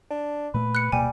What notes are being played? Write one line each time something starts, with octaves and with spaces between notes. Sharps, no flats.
D4
A#2 A3 B4
F#6 C#7
D1 B2 G3 A#3 G#5